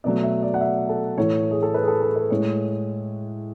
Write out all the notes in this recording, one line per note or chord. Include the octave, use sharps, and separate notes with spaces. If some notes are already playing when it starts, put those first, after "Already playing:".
B2 F#3 A3 D5
E5
D5
F#5
E5
A4
A2 E3 A3 C#5
G#4
A4
B4
G#4
A4
A4
B4
A2 G#3 C#5